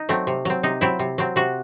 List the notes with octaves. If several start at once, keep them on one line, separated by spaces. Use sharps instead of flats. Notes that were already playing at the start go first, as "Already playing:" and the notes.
Already playing: D#4
F#3 A3 C4
C3
F#3 C4
C3 D#4
F#3 C4 E4
C3
F#3 C4
C3 F#4